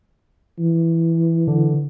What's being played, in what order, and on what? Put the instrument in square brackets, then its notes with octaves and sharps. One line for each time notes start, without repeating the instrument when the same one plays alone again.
[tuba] E3
[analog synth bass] D3